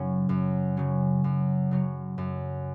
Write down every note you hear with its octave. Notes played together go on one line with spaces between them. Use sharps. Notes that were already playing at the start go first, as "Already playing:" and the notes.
Already playing: F#2 C#3 F#3 C#4
F#2
C#3 F#3 C#4
F#2
C#3 F#3 C#4
F#2